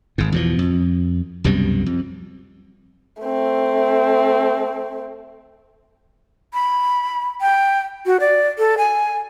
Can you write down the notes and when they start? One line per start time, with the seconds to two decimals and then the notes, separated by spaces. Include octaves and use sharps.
0.18 G#1 G#2
0.32 E2 B2 F3
0.59 F2
1.44 C2 F#2 B2 G3
1.86 F2
3.22 A3 C4
6.54 B5
7.41 G5
8.06 F#4
8.20 D5
8.59 A4
8.78 G#5